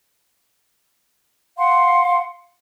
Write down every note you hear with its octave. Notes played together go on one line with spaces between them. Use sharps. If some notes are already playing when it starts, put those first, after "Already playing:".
F5 F#5 C6